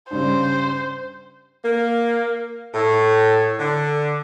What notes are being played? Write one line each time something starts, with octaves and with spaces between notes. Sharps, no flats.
G2 C#3 G3 C5
A#3
A2
D3